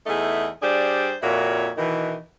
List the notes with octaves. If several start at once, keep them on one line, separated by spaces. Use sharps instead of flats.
E2 A3 D#4 G#4 E5
G3 D4 G#4 C5 D5
F2 A#2 E4 F#4 C#5
B2 D#3 E3